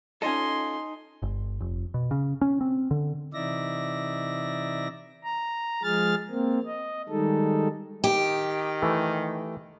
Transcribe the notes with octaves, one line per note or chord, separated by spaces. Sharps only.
C#4 D#4 F4 A4 D#5 G#5 C6
G1
F1
B2
C#3
C#4
C4
D3
C3 E3 D#4 D5 E5 A#6
A#5
F3 G#3 G#4 F6 A6
A#3 C4
D#5
D#3 G3 G#3 D#4 A4
D#3 G4
E3 A3